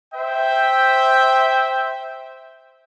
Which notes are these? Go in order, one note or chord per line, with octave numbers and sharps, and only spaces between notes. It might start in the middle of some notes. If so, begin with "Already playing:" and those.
C5 E5 G5